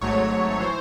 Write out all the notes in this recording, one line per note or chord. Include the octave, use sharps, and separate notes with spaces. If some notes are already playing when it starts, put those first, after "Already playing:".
G#1 G#2 F#3 A3 C#5
E3 C5